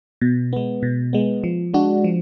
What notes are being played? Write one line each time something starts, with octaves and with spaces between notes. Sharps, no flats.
B2
G#3 B3
B2
G#3 B3
F3
G#3 D4 F#4
F3